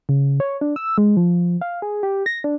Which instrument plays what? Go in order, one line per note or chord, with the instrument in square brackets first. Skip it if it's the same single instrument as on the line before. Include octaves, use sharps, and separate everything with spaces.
[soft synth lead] C#3
C#5
D4
E6
G#3
F3
F5
G#4
G4
A#6
D4